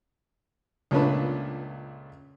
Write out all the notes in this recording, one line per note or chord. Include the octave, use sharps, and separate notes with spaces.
C#2 A#2 A3 C#4 D4 B4